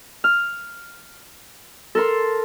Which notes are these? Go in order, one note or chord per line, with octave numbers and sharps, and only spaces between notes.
F6
A4 A#4 C6